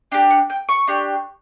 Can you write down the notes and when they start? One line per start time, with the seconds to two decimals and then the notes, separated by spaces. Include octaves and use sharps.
0.12 D4 G4 G5
0.31 F#5
0.50 G5
0.69 C#6
0.87 D4 G4